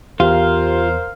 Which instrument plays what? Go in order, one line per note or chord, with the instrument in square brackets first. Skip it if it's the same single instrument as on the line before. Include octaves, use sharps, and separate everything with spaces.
[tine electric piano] E2 [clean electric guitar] F4 [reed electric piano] G4 [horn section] A#4 C5 F5